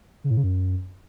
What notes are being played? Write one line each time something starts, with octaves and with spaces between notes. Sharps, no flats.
C#3
A2
C#3
F#2